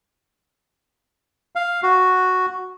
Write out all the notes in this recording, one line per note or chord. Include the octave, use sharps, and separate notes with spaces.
F5
F#4